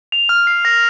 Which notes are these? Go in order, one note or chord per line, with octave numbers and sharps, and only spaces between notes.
F7
F6
C7
A#6